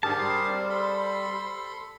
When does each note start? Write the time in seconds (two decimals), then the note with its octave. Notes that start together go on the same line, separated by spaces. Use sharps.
0.03 G#2 D3 G4 G#4 A#4 A5
0.19 G3 C5
0.49 C4
0.70 A4 B5 C6